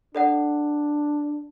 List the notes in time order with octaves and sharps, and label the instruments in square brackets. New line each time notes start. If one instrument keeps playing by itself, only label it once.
[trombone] D4 [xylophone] A4 D5 F#5